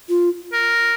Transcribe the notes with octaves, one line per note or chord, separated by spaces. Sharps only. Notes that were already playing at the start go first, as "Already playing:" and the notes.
F4
A#4